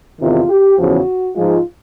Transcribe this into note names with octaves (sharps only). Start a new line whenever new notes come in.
E2 C3 D#3 F4
G4
E2 C#3 F3 F#4
G#2 F3 G#3 F4